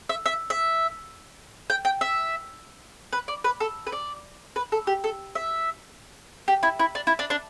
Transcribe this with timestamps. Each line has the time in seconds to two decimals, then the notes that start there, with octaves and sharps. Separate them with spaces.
0.09 E5
0.26 E5
0.50 E5
1.70 G5
1.85 G5
2.01 E5
3.13 B4
3.28 D5
3.44 B4
3.60 A4
3.87 B4
3.92 D5
4.56 B4
4.72 A4
4.87 G4
5.04 A4
5.35 E5
6.48 G4
6.63 E4
6.80 E4
6.95 D4
7.07 E4
7.19 D4
7.30 D4